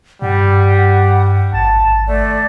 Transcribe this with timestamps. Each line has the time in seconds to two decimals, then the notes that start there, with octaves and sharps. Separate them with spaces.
0.22 G2 G3 F#5
1.53 G#1 A5
2.08 A3 D5